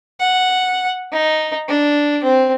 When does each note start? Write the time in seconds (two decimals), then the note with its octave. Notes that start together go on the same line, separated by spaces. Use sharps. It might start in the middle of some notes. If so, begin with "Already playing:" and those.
0.20 F#5
1.12 D#4
1.69 D4
2.23 C4